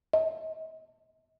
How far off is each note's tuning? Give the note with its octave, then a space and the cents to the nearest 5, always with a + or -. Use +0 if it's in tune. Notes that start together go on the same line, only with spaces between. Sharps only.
D#5 +45